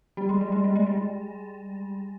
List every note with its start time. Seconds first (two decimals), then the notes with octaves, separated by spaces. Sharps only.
0.17 G3
0.29 G#3
0.41 G3
0.52 G#3
0.64 G3
0.76 G#3
0.86 G3
0.97 G#3